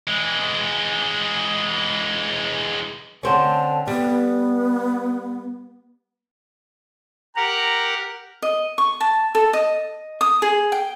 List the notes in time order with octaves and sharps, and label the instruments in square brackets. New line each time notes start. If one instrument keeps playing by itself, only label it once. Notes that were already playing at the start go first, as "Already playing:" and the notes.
[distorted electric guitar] E3 G#3
[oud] D3 C4 C#4 [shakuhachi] A5
[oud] G3 [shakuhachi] B3
[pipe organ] G4 A#4 F#5 [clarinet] A#5
[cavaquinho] D#5
C#6
A5
A4
D#5
D#6
G#4
G5